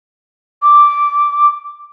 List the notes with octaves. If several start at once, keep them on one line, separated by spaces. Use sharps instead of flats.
D6